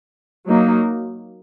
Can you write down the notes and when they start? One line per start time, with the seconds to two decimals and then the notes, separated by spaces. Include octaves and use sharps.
0.49 F#3 A#3 D#4